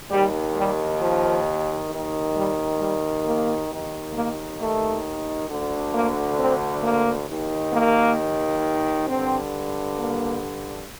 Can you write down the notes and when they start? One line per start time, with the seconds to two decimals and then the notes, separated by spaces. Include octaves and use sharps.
0.11 D#2 D#3 G3
0.55 G3
1.00 F3
1.90 D#2 D#3
2.34 G3
2.80 G3
3.25 A#3
3.69 D#2 D#3
4.14 A#3
4.59 A3
5.49 D2 D3
5.94 A#3
6.39 C4
6.83 A#3
7.28 D#2 D#3
7.73 A#3
9.07 G2 D3 C4
9.98 A#3